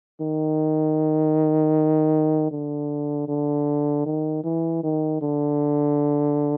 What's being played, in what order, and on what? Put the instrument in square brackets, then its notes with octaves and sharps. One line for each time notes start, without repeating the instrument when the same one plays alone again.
[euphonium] D#3
D3
D3
D#3
E3
D#3
D3